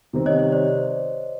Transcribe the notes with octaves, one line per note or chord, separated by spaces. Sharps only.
C3 D#3 G3 C4
C#5 D#5
C#5
C5 D5